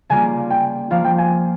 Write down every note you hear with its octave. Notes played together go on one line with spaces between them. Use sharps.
C#3 G3 A#3 F4 G#5
G5
F3 A#3 F4 F5
G5
G#5